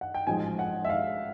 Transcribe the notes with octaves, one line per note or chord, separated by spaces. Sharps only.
F#5
G5
A1 G#2 F3 G#3 G#5
F#5
E5
F5